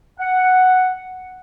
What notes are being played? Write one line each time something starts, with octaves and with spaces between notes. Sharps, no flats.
F#5